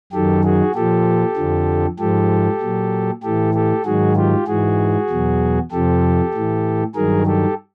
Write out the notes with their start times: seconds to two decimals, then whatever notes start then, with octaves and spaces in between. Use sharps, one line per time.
0.13 F#2 D#3 F#3 G4 A4
0.44 F#4 G#4
0.75 A#2 F3 G4 A4
1.37 F2 D3 F3
1.99 G#2 F3 G4 A4
2.61 A#2 F#3
3.23 A2 E3 G4 A4
3.54 G4 A4
3.85 G#2 D#3 F#3 F#4 G#4
4.16 F4 G4
4.47 G#2 E3 F#4 G#4
5.10 E2 B2 F#3
5.71 F2 C3 F3 G4 A4
6.34 A2 E3
6.95 G2 D#3 F#3 G#4 A#4
7.26 G4 A4